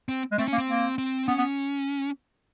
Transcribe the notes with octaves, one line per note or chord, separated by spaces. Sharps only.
C4
G#3
A3 C4
C#4
A#3
C4
A#3
C4
B3 C#4
B3